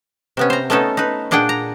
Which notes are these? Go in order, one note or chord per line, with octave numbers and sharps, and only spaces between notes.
C3 B3 C#4
C5 A#5
A3 B3 C#4 D#4 A4
D#4 B4
A#2 D4 G#4 F#5 G5
A#5